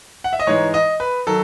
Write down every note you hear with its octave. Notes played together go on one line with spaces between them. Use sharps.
F#5
E5
D#5
G#2 E3 G#3 D#4 C#5
D#5
B4
D#3 F#3 A4